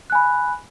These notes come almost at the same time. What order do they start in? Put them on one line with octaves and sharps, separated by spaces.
F#6 G#5 B5